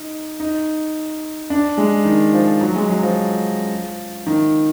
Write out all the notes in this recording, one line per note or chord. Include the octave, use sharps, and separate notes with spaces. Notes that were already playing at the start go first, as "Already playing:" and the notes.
Already playing: D#4
D#4
D4
G#3
D#3
F3
F#3
G#3
F#3
F3
D#3